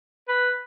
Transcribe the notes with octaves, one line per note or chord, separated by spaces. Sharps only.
B4